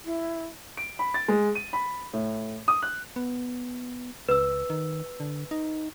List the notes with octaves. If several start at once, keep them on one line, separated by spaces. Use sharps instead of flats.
E4
D7
B5
A6
G#3
D#7
B5
A2
D#6
F#6
B3
C#2 B4 E6
D#3
D3
D#4